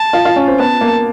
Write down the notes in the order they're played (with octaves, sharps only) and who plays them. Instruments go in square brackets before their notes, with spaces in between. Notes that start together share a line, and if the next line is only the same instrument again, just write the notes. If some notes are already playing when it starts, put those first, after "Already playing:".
Already playing: [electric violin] A5
[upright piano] F4
F4
C#4
C4
[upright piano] B3 [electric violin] A5
[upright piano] A#3